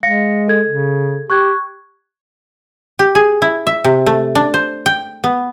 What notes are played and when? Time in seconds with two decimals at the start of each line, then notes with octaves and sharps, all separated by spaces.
0.03 G#3 F5 A#6 C#7
0.48 A4 G#6
0.68 C#3
1.30 G4 C#6 F#6 G#6
2.99 G4
3.15 G#4
3.42 E4
3.67 E5
3.84 C3
4.06 A3
4.35 D4
4.54 C5
4.86 G5
5.24 B3